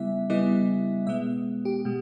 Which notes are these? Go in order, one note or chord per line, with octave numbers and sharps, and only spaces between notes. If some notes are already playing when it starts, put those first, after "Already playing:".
Already playing: C#3 G3 B3 E4 E5
C#3 G3 B3 E4 D#5
B2 G#3 B3 E5
G4
B2 G#3